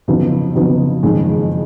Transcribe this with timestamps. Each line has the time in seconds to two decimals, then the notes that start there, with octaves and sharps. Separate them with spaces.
0.08 F2 C#3 F#3 B3 D#4
0.55 F2 C#3 F#3 B3 D#4
1.03 F#1 F2 D#3 G#3